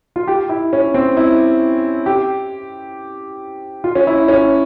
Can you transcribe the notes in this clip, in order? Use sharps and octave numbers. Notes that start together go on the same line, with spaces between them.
F4
G4
E4
C#4
C4
E4
G4
F4
C#4
E4
C#4